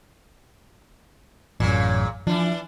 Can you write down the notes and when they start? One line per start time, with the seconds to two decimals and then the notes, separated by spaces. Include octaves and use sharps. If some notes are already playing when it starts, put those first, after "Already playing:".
1.60 A1 F#2 A#2 C#3
2.27 E3 F3 D4